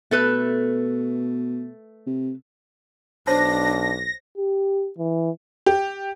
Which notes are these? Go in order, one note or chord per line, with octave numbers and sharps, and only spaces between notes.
B2 A3 A4 B4
C3
B1 D4 C5 C#5 A5 A#6
G4
E3
G4